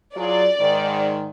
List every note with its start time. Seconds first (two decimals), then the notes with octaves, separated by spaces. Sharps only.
0.17 F#3 F4 G#4 D5
0.60 G#2 D#3